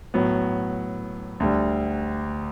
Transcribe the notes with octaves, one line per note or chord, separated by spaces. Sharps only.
A2 F#3 B3
D2 D3 G3